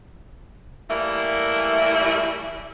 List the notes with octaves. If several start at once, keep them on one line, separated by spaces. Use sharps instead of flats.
E3 G3 A3 A#3 E4